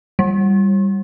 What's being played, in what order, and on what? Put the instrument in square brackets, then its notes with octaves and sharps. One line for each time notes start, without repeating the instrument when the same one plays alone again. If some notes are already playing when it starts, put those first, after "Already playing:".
[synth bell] G3